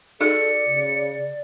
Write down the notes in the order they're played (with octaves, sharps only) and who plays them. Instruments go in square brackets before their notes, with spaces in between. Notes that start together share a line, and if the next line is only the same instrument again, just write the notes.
[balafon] D#4 F#4 G#4 [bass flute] A4 [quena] D5 [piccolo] C#7
[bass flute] C#3